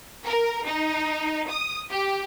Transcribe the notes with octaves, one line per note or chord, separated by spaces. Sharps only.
A#4
D#4
D#6
G4